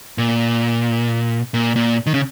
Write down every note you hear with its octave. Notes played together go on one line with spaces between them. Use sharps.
A#2
A#2
A#2
D#3
C#3